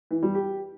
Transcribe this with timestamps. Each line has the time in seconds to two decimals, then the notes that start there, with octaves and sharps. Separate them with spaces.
0.11 E3
0.23 G3
0.35 G4